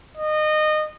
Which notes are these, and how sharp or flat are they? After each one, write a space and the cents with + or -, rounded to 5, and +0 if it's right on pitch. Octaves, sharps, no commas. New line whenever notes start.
D#5 -25